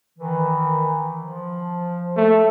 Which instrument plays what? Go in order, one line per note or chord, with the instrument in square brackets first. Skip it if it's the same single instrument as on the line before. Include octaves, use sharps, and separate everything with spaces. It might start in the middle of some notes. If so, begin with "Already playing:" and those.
[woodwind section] D#3 E3
F3
[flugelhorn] A3